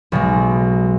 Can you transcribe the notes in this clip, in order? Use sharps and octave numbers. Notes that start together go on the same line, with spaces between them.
B1 B2 G#3